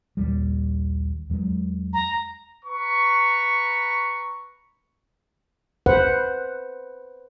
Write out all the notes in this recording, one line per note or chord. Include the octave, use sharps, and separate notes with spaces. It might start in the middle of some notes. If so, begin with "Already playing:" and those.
A#1 D#2 G3
E2 F#3 G#3
A#5
B4 A#5 C#6
B4 C5 F#5